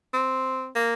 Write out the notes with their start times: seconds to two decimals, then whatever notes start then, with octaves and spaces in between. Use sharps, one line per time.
0.13 C4
0.75 A#3